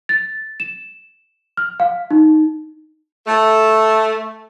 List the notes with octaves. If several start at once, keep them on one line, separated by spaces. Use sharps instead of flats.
A6
E7
F6
F5
D#4
A3